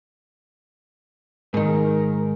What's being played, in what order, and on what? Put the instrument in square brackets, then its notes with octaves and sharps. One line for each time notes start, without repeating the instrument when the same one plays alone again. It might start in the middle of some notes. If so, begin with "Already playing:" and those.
[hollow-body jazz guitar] G#2 D#3 [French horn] A#4